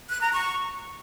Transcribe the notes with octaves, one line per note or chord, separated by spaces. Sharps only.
F#6
A#5
C#6